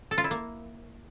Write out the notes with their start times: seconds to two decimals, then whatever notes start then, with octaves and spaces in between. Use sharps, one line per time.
0.11 A4
0.18 F4
0.24 E4
0.31 A#3